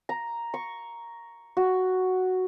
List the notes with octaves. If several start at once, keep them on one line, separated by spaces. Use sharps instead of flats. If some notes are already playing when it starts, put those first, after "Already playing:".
A#5
C#6
F#4